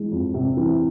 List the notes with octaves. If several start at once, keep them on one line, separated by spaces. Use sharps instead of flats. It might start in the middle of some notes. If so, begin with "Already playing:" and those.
Already playing: E3 G#3
F2
C3
E3